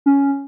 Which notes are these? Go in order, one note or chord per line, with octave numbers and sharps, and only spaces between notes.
C#4